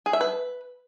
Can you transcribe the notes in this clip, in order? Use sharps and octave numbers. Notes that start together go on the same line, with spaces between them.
G#4
E5
B4